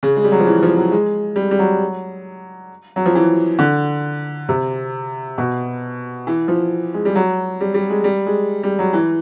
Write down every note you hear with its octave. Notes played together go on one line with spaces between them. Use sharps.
C#3
G#3
G3
F#3
F3
E3
F3
F#3
G#3
G3
G3
F#3
F#3
F3
E3
D3
C3
B2
E3
F3
G#3
G3
F#3
G3
G3
G#3
G3
G#3
G3
F#3
E3